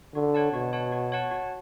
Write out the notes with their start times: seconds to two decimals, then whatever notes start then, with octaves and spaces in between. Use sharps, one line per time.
0.14 D3 F#4
0.35 C#5 F#5 A5
0.53 B2 F#4
0.73 C#5 F#5 A5
0.92 F#4
1.12 C#5 F#5 A5
1.31 F#4